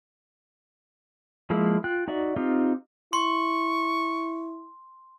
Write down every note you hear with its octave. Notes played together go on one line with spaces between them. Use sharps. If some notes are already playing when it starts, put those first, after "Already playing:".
F3 G#3 A#3 E4
F4 G5 F#6
D#4 F#4 D5 E5
C4 D#4 F4 G4
E4 C6 C#6